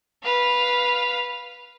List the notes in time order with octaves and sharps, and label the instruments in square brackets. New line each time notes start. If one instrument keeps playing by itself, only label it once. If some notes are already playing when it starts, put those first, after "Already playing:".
[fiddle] B4 F5